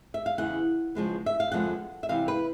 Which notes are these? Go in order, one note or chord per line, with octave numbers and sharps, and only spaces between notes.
E5
F5
E2 C#3 E3 F#5
C#3 F3 G#3 B3
E5
F5
F2 D3 F3 G#3 B3 F#5
E5
C3 E3 G3 F5
B4